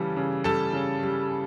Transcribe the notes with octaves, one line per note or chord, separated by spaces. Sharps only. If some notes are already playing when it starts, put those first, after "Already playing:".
Already playing: C#3 E3 G3 A4
C#3
G3 A4 A5
C#3
G3